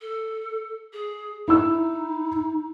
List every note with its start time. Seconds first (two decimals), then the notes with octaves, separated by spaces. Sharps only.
0.01 A4
0.93 G#4
1.48 D#4 E4 E6